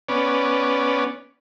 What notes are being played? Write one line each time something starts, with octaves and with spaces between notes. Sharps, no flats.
B3 C#4 D5